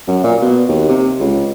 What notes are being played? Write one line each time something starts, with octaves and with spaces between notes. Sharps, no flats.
F#2
A#2
B2
D#2
C3
C#2